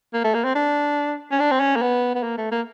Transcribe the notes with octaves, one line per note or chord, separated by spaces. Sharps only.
A#3
A3
A#3
C4
D4
C#4
D4
C4
C#4
A#3
B3
B3
A#3
A3
A#3